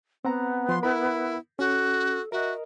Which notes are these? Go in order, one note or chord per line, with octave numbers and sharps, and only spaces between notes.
B3 C4 F#5 A#5
F3 C6
E4 A#4 B5
C#4 F#4 A4
F#4 A#4 D#5 E5